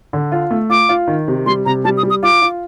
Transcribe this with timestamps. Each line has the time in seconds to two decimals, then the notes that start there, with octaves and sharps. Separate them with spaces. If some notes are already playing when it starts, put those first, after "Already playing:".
0.13 D3
0.32 F4
0.51 A3
0.70 F4 D6
0.89 F4
1.08 D#3
1.28 C3
1.46 G3 C6
1.65 C3 A#5
1.84 G3 A5
1.97 D#6
2.03 G3
2.10 D#6
2.23 F4 D6
2.42 F4